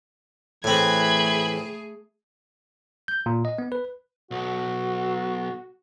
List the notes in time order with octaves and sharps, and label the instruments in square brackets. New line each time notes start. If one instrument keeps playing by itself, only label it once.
[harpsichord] A2 C4 [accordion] E3 [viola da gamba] A3 G#4 [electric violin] B5 G#6
[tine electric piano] G6
A#2
D#5
B3
B4
[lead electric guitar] B1 [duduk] F#4